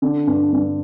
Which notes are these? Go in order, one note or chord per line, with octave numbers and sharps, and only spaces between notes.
D3
G2
G2